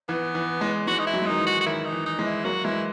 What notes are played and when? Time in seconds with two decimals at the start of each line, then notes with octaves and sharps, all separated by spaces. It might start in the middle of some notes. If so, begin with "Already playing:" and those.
0.09 E3 B3
0.35 E3
0.61 E3 G#3
0.87 E3 G#3 F#4
0.99 D#4
1.07 E4
1.13 F#3
1.22 G#3
1.26 D#3 F#3 D#4
1.40 E3
1.46 F#4
1.61 F#4
1.66 D#3 E4
1.85 D#4
1.92 E3
2.06 D#4
2.19 E3 G#3
2.26 E4
2.45 F#3 A#3 F#4
2.64 E3 G#3 E4